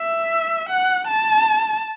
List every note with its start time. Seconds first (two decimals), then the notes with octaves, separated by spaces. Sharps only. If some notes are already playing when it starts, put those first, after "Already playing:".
Already playing: E5
0.69 F#5
1.08 A5